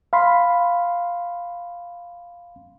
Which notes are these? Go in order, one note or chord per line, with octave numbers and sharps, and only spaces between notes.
F5 B5 C6